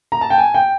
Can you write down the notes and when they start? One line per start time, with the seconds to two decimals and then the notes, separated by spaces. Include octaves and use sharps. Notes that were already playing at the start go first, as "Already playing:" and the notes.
0.12 A#5
0.21 A5
0.30 G5
0.38 G#5
0.54 G5